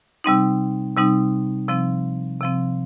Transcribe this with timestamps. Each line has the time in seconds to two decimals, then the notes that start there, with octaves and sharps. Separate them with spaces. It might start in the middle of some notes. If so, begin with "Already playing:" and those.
0.24 C3 G3 C4 D#4
0.97 C3 G3 C4 D#4
1.69 C3 F3 C4
2.41 C3 F3 C4